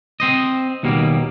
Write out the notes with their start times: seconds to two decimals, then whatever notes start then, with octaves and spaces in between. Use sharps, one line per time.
0.20 C4 C5 D#5
0.83 D#2 B2 G3 A#3